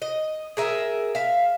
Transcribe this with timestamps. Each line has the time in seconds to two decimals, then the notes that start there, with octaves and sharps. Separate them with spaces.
0.02 D#5
0.57 G#4 A#4 E5
1.15 E5 F5